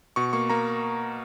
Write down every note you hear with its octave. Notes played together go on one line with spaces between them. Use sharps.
B2 C#6
A#3 C#6
A#3 A#5